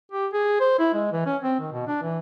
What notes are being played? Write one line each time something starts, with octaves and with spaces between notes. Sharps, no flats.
G4
G#4
C5
E4
G#3
E3
C#4
C4
D#3
B2
D4
E3